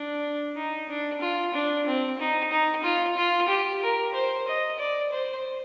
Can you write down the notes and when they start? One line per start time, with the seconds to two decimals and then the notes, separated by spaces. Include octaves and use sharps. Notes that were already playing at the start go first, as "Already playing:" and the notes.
Already playing: D4
0.56 D#4
0.89 D4
1.21 F4
1.54 D4
1.86 C4
2.19 D#4
2.51 D#4
2.83 F4
3.17 F4
3.49 G4
3.82 A#4
4.14 C5
4.47 D#5
4.79 D5
5.12 C5